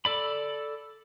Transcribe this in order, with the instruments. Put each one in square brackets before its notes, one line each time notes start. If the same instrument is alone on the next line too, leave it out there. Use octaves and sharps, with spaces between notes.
[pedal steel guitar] A4 D5 B5